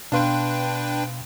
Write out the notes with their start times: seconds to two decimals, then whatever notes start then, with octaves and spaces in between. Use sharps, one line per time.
0.12 B2 D4 B4 F5 G5 C6